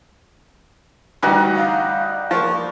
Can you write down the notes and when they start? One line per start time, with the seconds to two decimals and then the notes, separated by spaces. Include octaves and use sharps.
1.23 D2 E3 G3 D#4 F#4
1.56 F5
2.31 F3 A#3 C#6